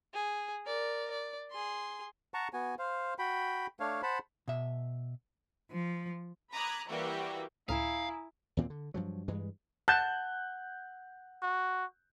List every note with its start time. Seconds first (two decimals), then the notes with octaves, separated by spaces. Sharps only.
0.14 G#4
0.66 A#4 D5
1.11 D5
1.51 G#4 C6
2.34 F#5 A5 A#5 C#6
2.53 B3 F#4 G#5
2.79 C5 F5
3.19 F#4 G5 B5
3.80 A3 D4 C#5 F5
4.03 C5 F#5 A5 B5
4.48 B2 E5
5.71 F3
6.52 A#5 B5 D6 D#6 F#6 G#6
6.88 E3 G3 A#3 F#4 G4 G5
7.69 C#2 A2 E4 F5 G#5 A#5 D#6
8.57 D#2 A#2 E3 C4
8.70 D3
8.94 G2 F3 F#3
9.28 G2 E3 G#3
9.88 F#5 A5 F#6 G6
11.43 F#4